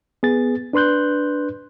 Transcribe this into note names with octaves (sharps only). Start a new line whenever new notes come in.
B3 G#4 A6
D4 B4 C6 F#6 G6